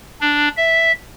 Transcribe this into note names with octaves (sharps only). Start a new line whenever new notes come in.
D4
E5